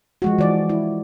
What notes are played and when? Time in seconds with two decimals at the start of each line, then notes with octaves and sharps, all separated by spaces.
0.22 F3 G#3 F#4
0.38 E3 D5
0.69 E4